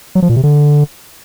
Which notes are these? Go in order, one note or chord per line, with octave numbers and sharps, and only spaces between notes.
F#3
F3
A#2
C3
D3